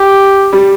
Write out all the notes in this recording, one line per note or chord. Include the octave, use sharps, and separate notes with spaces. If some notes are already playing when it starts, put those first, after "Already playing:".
Already playing: G4
G3